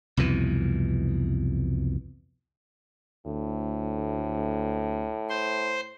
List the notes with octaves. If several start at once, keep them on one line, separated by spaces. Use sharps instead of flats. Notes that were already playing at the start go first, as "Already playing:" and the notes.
C2 F2 B2 E3
D2 A2
C5 C6